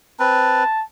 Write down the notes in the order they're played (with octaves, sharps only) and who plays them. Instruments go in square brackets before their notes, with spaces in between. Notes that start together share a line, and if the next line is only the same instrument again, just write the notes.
[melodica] C4 B4 [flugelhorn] A5